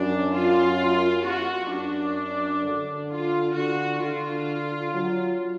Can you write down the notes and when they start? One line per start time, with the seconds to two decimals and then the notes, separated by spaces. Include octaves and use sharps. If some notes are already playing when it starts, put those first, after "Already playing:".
Already playing: F#2 D4
0.34 F4
1.26 F#4
1.72 F#2 D4
2.64 D3
3.10 F4
3.55 D3 F#4
4.02 D3 F4
4.94 F#3